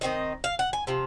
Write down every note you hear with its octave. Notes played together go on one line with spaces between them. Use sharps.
D#3 F#3 C4 D#4 D#5
F5
F#5
G#5
C3 F3